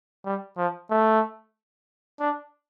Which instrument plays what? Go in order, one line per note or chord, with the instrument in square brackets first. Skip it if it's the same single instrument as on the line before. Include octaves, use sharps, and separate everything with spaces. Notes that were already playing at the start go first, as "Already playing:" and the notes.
[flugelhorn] G3
F3
A3
D4